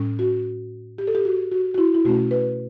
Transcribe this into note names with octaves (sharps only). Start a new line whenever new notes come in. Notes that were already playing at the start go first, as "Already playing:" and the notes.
Already playing: A2 G3 C#4
F#4
G4
A4
G4
F#4
F#4
F#4
E4
E4
B2 A3 C#4 F#4
B4